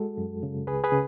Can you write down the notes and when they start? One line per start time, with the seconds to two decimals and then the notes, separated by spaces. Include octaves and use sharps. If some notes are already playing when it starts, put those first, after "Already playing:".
Already playing: G#3 F#4 A4
0.18 F#2
0.43 C#3
0.67 C#2 G#4 B4
0.84 G#4 B4
0.92 C#3